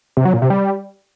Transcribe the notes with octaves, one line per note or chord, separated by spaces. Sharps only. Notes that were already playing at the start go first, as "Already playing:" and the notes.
C3
F#3
A#2
C3
G3